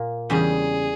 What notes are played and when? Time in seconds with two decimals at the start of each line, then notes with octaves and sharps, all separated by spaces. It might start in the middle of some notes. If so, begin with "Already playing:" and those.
Already playing: A#2 A#3
0.30 E2 C#3 G3 G#4